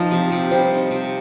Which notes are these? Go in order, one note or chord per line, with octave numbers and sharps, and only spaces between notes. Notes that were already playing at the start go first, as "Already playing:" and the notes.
Already playing: F3 D#4
C3
C3
G3 C4
D#4
C3